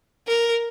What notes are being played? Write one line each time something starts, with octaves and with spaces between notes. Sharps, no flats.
A#4